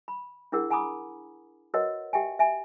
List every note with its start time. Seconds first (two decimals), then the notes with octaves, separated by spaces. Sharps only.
0.08 B5
0.52 D4 E4 G#4 A#4 F#5
0.70 F#5 G#5 A#5 B5 D6 D#6
1.74 F#4 A#4 B4 C#5 D#5 F#5
2.13 G4 E5 G5 G#5
2.39 E5 G#5